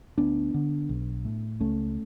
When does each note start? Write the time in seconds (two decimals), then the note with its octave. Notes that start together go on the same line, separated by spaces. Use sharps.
0.18 D2 B3 D4
0.54 D3
0.89 B1
1.25 A2
1.60 C#2 A3 C#4